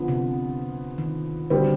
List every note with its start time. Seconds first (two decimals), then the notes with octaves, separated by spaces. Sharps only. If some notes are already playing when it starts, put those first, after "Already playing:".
Already playing: D3 F3 B3
0.08 C3
0.98 D#3
1.50 B2 D3 G3 C4